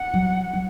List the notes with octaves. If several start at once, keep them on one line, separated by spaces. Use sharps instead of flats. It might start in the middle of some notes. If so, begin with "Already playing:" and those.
Already playing: F#5
F#3
F#3